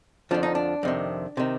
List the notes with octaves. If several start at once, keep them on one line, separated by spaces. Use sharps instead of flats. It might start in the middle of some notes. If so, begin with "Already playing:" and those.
F2 D3 F3 D4
D#4
D4
F2 C3 D#3
C3 D#3